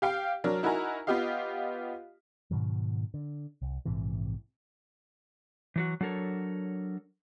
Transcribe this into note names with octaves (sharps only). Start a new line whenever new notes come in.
G4 F5 G5
F#3 D4 A#4
D#4 E4 F#4 A#4 G#5 A#5
B3 F4 G4 D#5 F5
G#2 B2 D#3 F#3
D3
C2
A#1 G#2 C3 E3
E3 F#3 F#4
F#3 D4 A4 A#4 C#5